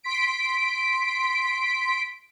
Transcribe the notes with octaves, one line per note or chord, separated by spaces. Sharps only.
C6 B6 D7